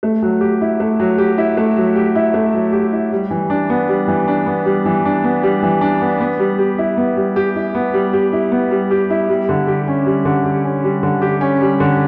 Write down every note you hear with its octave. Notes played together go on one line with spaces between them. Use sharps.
A3
F#3
G4
E4
A3
F#3
G4
E4
A3
F#3
G4
E4
A3
F#3
G4
E4
G3
E3
D4
B3
G3
E3
D4
B3
G3
E3
D4
B3
G3
E3
D4
B3
B3
G3
G4
E4
B3
G3
G4
E4
B3
G3
G4
E4
B3
G3
G4
E4
G3
D3
G4
C#4
G3
D3
G4
C#4
G3
D3
G4
C#4
G3
D3